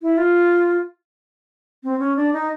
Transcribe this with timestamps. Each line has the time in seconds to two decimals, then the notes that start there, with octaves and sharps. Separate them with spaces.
0.02 E4
0.17 F4
1.84 C4
1.99 C#4
2.16 D4
2.33 D#4